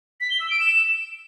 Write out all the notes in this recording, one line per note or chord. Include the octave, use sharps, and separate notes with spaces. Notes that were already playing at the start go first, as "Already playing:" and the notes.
B6
G7
E6
D7
E7